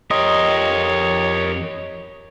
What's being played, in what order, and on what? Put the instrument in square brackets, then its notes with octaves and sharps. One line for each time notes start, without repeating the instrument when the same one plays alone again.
[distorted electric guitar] F2 C6 [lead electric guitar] G4 A#4 [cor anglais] C#5 [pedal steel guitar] D#5